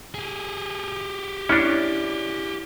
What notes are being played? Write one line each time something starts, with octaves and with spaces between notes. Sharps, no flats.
G4 G#4
C#4 D4 E4 F6 F#6